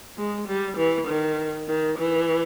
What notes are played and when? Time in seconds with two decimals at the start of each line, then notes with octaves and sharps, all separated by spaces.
0.17 G#3
0.47 G3
0.77 E3
1.08 D#3
1.68 D#3
1.98 E3